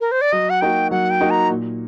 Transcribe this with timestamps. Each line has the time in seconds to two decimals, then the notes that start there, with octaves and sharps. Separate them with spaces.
0.01 A#4
0.12 C5
0.21 D5
0.32 F#3 D#5
0.50 F#5
0.61 A#3 D#4 F#4 G5
0.91 F#3 F#5
1.10 G5
1.20 A#3 D#4 F#4
1.30 A#5
1.50 A#2